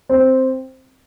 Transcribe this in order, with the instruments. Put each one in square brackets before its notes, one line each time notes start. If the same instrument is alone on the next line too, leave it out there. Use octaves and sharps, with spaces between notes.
[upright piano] C4